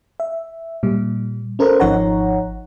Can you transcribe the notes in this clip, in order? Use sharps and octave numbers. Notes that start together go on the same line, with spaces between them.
E5
A#2 G3
C#4 A4 A#4 C5
G#1 F3 D#4 C#5 F#5 A#5